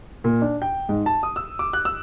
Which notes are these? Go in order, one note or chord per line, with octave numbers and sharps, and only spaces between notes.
A#2
D4
G5
G#2
A5
D#6
E6
D6
F#6
E6